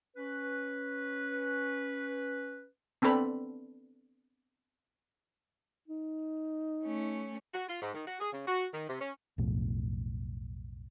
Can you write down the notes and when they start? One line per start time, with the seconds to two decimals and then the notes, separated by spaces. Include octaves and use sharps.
0.16 C#4 B4
3.02 B3 C4 D4 A4 B5
5.88 D#4
6.83 A3 C#4
7.54 F#4
7.68 F4
7.82 G#2
7.94 D#3
8.06 F#4
8.20 G#4
8.33 C#3
8.46 F#4
8.73 D#3
8.88 C3
9.00 C#4
9.38 B1 F2 A2